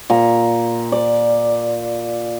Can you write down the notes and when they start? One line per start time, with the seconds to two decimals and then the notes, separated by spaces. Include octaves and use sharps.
0.10 A#2 A#5
0.92 D5